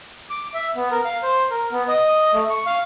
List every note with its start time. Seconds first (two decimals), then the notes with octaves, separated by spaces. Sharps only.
0.30 D6
0.54 E5
0.76 B3
0.91 A#4
1.05 F5
1.23 C5
1.51 A#4
1.72 B3
1.88 D#5
2.33 A3
2.50 C#6
2.66 F5